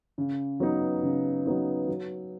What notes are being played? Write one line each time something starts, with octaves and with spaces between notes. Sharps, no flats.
C#3
F#3 B3 D#4
C#3
F#3 B3 D#4
F#3